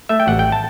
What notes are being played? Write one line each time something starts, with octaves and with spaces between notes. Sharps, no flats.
A3 E5
G5
A1 F#5
G5
A5